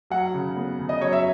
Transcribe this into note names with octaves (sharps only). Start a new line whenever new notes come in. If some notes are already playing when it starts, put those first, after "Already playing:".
F#3 F#5
C#3
B3
C#3
D#5
F#3 C#5
E5